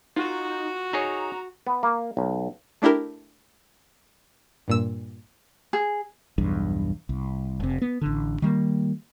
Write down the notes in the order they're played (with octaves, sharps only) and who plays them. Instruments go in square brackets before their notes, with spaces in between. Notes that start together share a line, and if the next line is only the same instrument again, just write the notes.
[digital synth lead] D#4 [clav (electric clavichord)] F4 [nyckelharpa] F#4
[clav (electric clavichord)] D#4 G#4 C#5 [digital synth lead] A#5
[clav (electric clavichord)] B3
A#3
B1
[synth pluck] A3 D4 E4 G4 A#4
G2 A#2 E6
[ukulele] G#4
[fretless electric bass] B1 E2 G2
C2
F1 C3
B3
A1 D3
D#3 G3 A#3